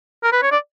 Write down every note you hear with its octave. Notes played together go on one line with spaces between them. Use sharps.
A#4
B4
C#5
D5